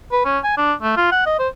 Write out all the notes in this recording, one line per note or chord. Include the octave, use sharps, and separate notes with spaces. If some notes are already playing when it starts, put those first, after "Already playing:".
B4
C#4
G#5
D4
A3
F4
F#5
D#5
C5